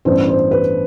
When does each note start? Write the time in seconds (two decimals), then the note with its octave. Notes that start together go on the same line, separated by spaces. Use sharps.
0.05 A1 G2 E3 B3 C5
0.28 C5
0.51 B4